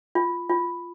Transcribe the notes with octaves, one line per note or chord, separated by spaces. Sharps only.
F4
F4